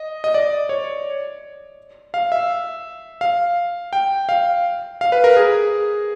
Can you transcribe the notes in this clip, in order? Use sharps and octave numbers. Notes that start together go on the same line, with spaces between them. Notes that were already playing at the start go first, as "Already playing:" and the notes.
Already playing: D#5
D#5
D5
C#5
F5
E5
F5
G5
F5
F5
B4
A#4
G#4